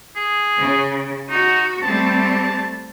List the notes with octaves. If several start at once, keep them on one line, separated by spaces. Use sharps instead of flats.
G#4
C#3
D#4 F#4
G3 A3 C4 A5